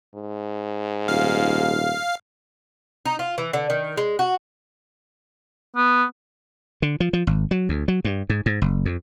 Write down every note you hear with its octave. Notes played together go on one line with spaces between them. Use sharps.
G#2
D#1 F5
D#4
F4
E3
D3
D#3
G#3
F#4
B3
D3
F3
F3
G#1
F#3
D2
F#3
G2
G#2
G#2
F#1
F2